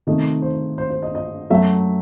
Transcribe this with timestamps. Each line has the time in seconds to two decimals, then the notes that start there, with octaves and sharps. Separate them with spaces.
0.07 C3 D#3 A3 D#5
0.42 C5
0.78 C5
0.90 C5
1.03 D#5
1.15 D#5
1.50 F#2 F#3 A3 E5